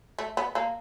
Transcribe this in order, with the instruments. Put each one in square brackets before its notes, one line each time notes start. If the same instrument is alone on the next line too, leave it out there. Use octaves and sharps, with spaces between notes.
[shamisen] A3
B3
A#3